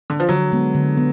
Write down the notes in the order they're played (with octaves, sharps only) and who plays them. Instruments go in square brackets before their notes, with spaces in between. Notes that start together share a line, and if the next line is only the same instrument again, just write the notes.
[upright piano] D3
F3
[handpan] D3 [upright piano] F#3
[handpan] G#3 B3
D3
B3